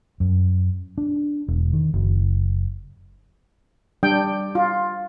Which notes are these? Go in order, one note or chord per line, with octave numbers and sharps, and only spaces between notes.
F#2
D4
E1
D#3
F#1
G3 D4 G5
F4